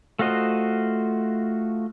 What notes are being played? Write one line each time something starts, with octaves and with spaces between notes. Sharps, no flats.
A3 F4 F#4 C5 D#5